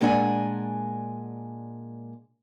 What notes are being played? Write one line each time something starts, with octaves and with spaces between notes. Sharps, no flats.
A#2 G#3 D4 F#5 G#5